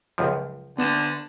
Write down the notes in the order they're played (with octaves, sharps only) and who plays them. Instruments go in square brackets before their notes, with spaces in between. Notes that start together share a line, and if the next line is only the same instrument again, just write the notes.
[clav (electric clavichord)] C#2 F#2 F3
[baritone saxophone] D3 [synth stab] B3 E7